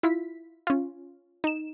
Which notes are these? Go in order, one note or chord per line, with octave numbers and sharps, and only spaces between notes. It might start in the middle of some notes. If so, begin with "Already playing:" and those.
E4 F4 B6
C#4 F4
D#4 E7